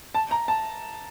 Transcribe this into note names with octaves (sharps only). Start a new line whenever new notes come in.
A5
A#5
A5